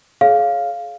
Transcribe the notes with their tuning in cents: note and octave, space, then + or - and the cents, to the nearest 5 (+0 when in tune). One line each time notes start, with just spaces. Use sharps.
G#4 +35 C#5 +0 F5 +0